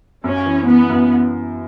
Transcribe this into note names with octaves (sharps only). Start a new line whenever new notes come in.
F#2 C#4
E3
E3 B3
F#2